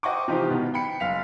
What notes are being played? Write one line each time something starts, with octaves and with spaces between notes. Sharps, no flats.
C5 D#5 F#5 G5 C#6 D6
C3 E3 F3 D#4 F4 G4
B2 D#3 B3
G5 B5 C#7
F#1 F5 B6 F7